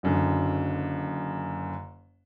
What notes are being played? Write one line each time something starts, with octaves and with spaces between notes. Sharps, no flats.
F#1 F#2 D3